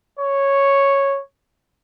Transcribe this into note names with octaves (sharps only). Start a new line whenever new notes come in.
C#5